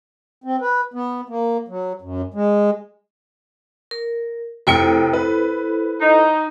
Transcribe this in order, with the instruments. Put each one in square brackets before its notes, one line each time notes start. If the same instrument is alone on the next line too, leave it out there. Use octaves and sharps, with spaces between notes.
[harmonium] C4
B4
B3
A#3
F#3
F#2
G#3
[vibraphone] A#4
[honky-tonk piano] F1 G5 C#7 [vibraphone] E4 A4 C5
[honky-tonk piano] B4
[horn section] D#4